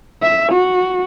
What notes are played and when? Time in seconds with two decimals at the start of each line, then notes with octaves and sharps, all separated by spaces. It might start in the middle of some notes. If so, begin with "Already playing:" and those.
0.23 E5
0.52 F#4